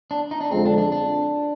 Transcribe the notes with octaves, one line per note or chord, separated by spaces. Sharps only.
D4
D#4
D4
F2 D3 F3 G#3 C4
D4
D4
D4